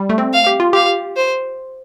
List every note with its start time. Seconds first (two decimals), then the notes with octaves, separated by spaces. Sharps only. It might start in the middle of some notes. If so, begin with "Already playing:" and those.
Already playing: G3
0.09 A3
0.18 C4
0.33 F5
0.47 G4
0.60 F4
0.73 G4 F5
1.17 C5